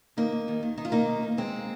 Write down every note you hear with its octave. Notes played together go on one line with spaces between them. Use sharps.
D#2 A#3 D#4
D#2
D#2
D#3
D#3 D#4
F4
D#3 A#3 D#4
D#2
D#2
D#2 G#3 C4